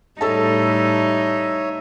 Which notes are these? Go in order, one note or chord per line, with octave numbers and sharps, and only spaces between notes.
A2 G3 D#4 A4 C#5 E5 A5